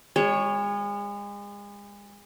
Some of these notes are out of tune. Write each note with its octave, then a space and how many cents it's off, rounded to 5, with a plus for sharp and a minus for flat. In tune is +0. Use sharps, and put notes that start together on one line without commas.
G#3 -35 C#5 +0